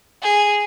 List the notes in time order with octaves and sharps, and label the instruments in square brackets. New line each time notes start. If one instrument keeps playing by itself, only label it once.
[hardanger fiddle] G#4